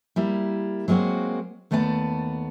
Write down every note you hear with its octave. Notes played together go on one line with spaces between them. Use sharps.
G3 A#3 E4
F#3 G#3 A#3 C4 F#4
D#2 A3 B3 D5 F5 A5